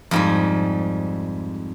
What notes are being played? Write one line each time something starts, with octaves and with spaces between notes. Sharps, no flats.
F2 G#2 G3